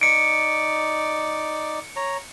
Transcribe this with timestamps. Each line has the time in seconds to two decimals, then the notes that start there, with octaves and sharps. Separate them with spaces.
0.01 D#4 D5 C#7 D7
1.96 C#5 A#5